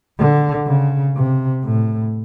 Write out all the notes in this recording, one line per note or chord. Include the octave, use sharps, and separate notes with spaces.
D3
C#3
C3
A2